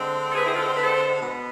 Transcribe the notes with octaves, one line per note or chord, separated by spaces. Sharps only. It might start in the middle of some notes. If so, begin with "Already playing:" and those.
Already playing: D3 G#3 C4
A4
G#4 B4
E4 G#4
F4 A4
C5
B4
A4 C5
B2 B3